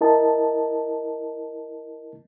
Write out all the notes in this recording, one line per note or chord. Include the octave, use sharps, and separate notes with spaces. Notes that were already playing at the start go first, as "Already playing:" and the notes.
E4 A#4 D#5 A5